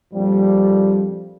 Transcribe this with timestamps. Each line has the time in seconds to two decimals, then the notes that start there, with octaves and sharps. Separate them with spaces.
0.14 A#1 F2 A#2 F3 G3